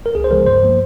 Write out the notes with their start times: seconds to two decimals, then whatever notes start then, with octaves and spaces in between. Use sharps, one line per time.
0.06 A#4
0.15 C#2 G#4
0.24 C5
0.31 C#3 F3 G#3 A#4
0.47 G2 C5
0.63 F3 A#3